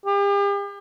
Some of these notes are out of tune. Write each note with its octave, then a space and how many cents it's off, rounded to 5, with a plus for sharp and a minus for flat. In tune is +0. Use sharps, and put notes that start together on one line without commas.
G4 +40